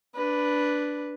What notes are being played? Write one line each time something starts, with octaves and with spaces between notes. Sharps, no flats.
D4 B4